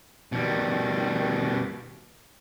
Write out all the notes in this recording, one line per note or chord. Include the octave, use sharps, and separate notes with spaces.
B2 D#3 G3